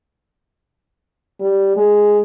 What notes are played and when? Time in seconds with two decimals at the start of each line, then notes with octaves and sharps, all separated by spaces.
1.40 G3
1.77 G#3